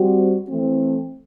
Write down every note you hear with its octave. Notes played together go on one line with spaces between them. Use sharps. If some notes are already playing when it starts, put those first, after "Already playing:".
Already playing: G3 C4 F#4
E3 A3 C4